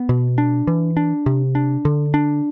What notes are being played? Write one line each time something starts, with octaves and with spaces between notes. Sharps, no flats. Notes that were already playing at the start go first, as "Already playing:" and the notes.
Already playing: B3
B2
D4
E3
D4
C3
D4
D3
D4